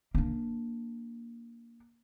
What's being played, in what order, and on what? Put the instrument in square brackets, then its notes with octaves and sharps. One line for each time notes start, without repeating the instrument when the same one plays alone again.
[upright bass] A#3 D4